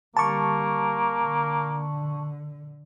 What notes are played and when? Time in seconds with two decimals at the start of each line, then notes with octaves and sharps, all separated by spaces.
0.17 D3 G3 A#3 A5 C#6
1.24 D3